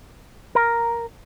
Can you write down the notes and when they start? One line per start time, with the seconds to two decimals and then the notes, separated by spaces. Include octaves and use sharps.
0.55 A#4